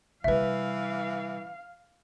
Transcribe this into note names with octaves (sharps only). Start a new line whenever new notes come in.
C3 E3 G3 B4 E5 F5